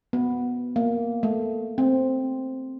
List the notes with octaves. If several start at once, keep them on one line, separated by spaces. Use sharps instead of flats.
B3
A#3
A3
C4